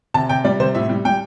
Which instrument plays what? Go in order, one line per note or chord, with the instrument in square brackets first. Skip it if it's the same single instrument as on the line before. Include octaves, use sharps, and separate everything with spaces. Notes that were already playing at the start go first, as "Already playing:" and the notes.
[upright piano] C3 A5
C3 G5
G3 D5
C3 C5
A2 E5
G3
G3 G5